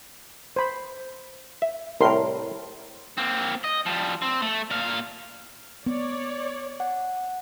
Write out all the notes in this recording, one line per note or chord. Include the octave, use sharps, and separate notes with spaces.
C5 B5
E5
C2 A2 A#4 C6
A#3 C4
D#5
F3 G3
C4
A3
A#2 F5
B3 C#5 D5
F#5